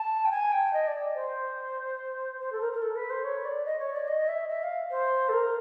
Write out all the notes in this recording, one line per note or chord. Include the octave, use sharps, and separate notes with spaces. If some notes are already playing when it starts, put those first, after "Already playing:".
Already playing: A5
G5
G#5
G5
D#5
D5
C5
C5
A4
A#4
A#4
A4
B4
C5
C#5
D5
D#5
C#5
D5
D#5
E5
E5
F5
C5
A4
A#4